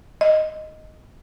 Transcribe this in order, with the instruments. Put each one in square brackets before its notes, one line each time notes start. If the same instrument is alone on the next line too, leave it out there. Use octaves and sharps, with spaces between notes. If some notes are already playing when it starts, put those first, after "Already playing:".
[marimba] D#5